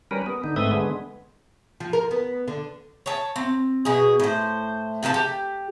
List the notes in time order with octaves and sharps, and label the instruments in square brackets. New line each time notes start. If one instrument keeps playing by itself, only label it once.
[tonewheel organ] G3 C#4 A#4 B4
B3
D3 D#4
G#2 A3 C4 B4 E5 D#6
D3 G#3 B3
[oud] F3
A#4
B3
D3
[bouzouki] C#5 A5
C4
B2 G#4
A2 C5
C3 F3 A4 A5
G4